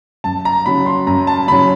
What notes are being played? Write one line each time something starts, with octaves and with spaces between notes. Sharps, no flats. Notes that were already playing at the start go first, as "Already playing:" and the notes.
F#2 A5
A#5
C#3 F#3 B5
C6
F#2 A#5
A5
C#3 F#3 B5